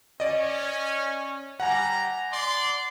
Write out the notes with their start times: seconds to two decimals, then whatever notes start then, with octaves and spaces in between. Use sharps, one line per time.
0.20 C#4 D5 D#5
1.60 G3 F#5 G#5 A#5
2.31 D5 C6